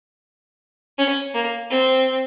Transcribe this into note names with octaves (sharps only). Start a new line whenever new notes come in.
C#4
A#3
C4